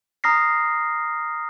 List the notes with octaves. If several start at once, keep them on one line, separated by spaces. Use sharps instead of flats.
A#5 D#6 F6 A#6 C7